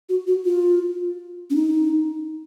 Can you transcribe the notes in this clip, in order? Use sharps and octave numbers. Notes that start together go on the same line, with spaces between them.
F#4
F#4
F4
C#4
D#4